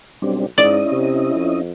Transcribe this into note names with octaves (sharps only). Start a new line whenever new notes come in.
B1 G3 C4 D4
G#2 C#4 E4 D5 D#5
C3
F2